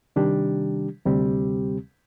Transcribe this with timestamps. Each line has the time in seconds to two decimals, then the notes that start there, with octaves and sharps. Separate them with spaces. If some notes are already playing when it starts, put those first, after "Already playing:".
0.16 C3 D#3 G3 D4 G4
1.06 D2 C3 G3 C4 G4